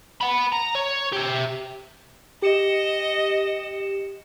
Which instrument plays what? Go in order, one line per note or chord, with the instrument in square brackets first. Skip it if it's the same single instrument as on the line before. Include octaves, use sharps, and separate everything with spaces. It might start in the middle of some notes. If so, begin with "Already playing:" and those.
[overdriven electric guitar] F#5 B5
A#5
C#5
G4 E5
[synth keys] G4 C#7 E7 [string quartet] D#5